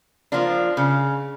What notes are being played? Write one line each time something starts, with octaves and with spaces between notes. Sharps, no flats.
F3 A#3 D4
C#3